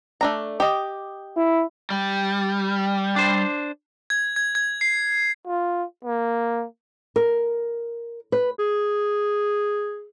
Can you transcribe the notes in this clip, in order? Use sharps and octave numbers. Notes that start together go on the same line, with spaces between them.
A3 D4 A#5
G4 D#5
E4
G3
D4 C5
G#6
G#6
G#6
C7
F4
A#3
A#4
B4
G#4